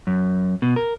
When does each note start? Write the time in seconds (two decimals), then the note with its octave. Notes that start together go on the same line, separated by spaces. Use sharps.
0.07 F#2
0.62 B2
0.76 A#4